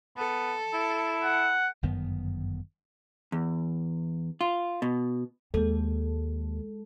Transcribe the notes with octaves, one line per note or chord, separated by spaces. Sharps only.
B3 A4
E4
F#5
G1 F#2 D#3 B3
E2
F4
B2
D#2 G#3 A4